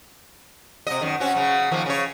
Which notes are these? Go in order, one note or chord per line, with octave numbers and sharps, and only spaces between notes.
C3 D#5
F#2 D#3
C4 C#4 F#4
C#3 F#3
D#3 F3 A#3
C#3 C#5